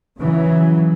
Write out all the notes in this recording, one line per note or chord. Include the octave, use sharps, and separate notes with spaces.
C#3 E3 F#3